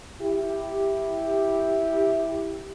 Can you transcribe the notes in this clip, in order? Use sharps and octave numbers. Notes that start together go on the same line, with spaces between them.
E4 G4